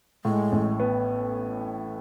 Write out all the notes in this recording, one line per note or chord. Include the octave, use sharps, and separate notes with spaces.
A2 G#3
A1
B3